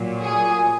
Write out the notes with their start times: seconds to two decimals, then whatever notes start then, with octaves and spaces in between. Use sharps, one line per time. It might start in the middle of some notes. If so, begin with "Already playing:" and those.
Already playing: A#2 F#3
0.21 G#4